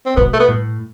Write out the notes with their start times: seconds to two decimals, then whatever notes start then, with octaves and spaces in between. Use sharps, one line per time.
0.06 C4
0.16 B2 B3
0.33 A3
0.40 B3
0.48 A2